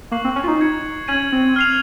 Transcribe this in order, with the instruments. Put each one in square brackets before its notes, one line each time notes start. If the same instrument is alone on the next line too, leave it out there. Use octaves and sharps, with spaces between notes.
[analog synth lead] A#3 [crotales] C#6 F#6 C7 F#7
[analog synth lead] C4
C#4
F4
D#4
[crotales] C#6 G#6 C#7
[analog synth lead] C#4 [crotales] G#6 D#7 F#7
[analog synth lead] C4
[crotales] F6 C7 F7